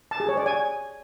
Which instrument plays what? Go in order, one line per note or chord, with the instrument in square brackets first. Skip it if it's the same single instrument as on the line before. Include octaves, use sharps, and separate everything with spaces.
[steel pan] A5
G#4
C#5
D5
G#5